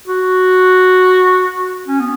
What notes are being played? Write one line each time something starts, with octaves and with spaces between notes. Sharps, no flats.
F#4
C#4
B3